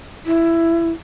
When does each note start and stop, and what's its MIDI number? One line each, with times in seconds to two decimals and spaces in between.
0.26 0.91 64